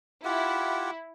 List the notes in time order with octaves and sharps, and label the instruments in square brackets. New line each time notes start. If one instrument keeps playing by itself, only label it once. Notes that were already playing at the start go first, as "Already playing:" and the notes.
[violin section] E4 [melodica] F4 G4 F#5